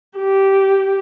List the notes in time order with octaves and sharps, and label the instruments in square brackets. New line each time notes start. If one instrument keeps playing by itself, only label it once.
[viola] G4